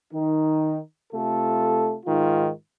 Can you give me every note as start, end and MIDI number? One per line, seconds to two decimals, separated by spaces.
0.12 0.78 51
0.12 0.78 63
1.13 1.96 48
1.13 1.96 57
1.13 1.96 65
1.13 1.96 69
2.06 2.50 44
2.06 2.50 51
2.06 2.50 63
2.06 2.50 65